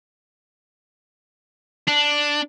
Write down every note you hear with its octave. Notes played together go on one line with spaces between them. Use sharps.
D4